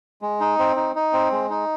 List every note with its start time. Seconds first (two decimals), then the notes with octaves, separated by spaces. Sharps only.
0.22 G#3
0.40 D#4
0.59 C4
0.76 D#4
0.95 D#4
1.13 C4
1.31 G#3
1.50 D#4